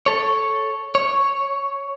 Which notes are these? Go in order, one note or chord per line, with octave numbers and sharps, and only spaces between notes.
A4 C#5
C#5